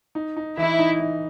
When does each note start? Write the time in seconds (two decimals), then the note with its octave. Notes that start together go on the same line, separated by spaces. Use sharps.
0.15 D#4
0.37 D#4
0.57 E3 E4
0.79 D#4
1.00 D#4